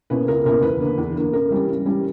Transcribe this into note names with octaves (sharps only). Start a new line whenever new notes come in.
B2 A#3 C#4 E4 B4
C#2 A#4
B2 A#3 C#4 E4 A#4
E2 B4
D3 A#3
E2
D3 A#3
C#3 A#4
E3 G3 C#4
C#3
E3 G3 C#4